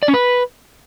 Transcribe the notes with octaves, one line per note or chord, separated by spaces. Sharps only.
D5
C#4
B4